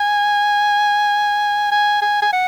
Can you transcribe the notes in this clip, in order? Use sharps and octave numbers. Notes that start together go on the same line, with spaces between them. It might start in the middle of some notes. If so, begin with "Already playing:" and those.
Already playing: G#5
G#5
G#5
G#5
F#5